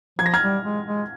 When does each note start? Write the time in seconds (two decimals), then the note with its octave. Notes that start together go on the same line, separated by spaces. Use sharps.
0.19 F3 G#6
0.26 A#6
0.34 F6 G#6
0.42 G3
0.64 G#3
0.87 G#3